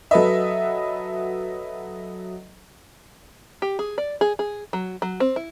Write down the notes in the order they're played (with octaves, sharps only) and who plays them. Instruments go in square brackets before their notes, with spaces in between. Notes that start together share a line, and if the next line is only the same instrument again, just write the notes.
[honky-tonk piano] F#3 A4 B4 D#5 E5
[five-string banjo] G4
G#4
D5
G#4
G#4
F#3
F#3
C4
E4